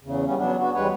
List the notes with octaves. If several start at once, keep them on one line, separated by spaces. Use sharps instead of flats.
E2 C#3
G3 B3 C#4
F#3 B3 D4
B3 F#4
E2 G3 G#3 B4 C#5